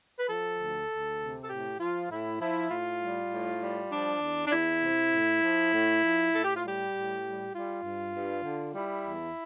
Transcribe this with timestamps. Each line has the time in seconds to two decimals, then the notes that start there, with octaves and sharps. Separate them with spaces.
0.18 B4
0.28 F3 A4
0.59 D2
0.89 D2
1.20 C3
1.43 A4
1.49 A2 G4
1.79 F3 F4
2.10 A2 E4
2.40 F3 E4
2.70 A2 F4
3.00 G3
3.30 A2
3.61 G3
3.91 F3 D4
4.22 E2
4.47 D4
4.51 E2 E4
4.81 C3
5.12 A2
5.42 F3
5.73 A2
6.03 F3
6.32 A2 A4
6.44 G4
6.56 F4
6.64 G3 G4
6.94 A2
7.24 G3
7.53 G3 F4
7.83 G2
8.15 G2
8.44 D3
8.75 G3 E4
9.05 E2